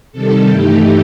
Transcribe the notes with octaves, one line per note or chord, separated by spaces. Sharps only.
C3 D#3 G3 A4
G2 E3 A3 D#4 G4